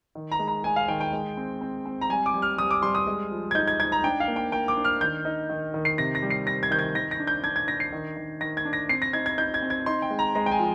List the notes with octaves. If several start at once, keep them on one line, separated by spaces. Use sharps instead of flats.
D#3
A#5
G#3
A#5
G#3 G#5
F5
D#3 G5
G5
G#3
C4
C4
C4
A#5
G3 G#5
D6
G3
F6
G3 D#6
D6
G3 C6
D#6
G#3
F3
G#6
D#4 G6
G#6
D#4 G#6
A#5
D4 G5
F5
A#3
G5
A#3 G5
D6
D4
F6
D#3 G6
D#4
D#3
D#3
C7
C3 A#6
A#6
G3
C7
C4 A#6
G#6
D#3 G6
G#6
D#3 A#6
A#6
D4
G6
D4 G#6
G#6
D4 A#6
C7
D#3
D#3
D#3 A#6
G#6
D4
A#6
C4 C7
A#6
D#4 G#6
G#6
D#4 G6
G#6
C4
G#6
D#4 C6
G5
G#3
A#5
G#3 A#5
G5
G#5
F3